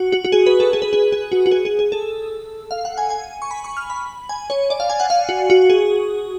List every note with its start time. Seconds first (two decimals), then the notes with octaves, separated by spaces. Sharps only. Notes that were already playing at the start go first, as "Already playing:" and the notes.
Already playing: F#4
0.12 F#4
0.25 F#4
0.32 G#4
0.46 B4
0.60 A4
0.73 G#4
0.82 B4
0.93 G#4
1.12 G#4
1.32 F#4
1.46 F#4
1.51 G#4
1.65 G#4
1.79 G#4
1.92 A4
2.71 F5
2.85 F#5
2.98 G#5
3.10 G#5
3.42 C#6
3.51 B5
3.64 C#6
3.77 F6
3.90 B5
4.29 G#5
4.50 C#5
4.70 D5
4.80 F5
4.90 G#5
5.00 F#5
5.10 F5
5.29 F#4
5.50 F#4
5.70 G#4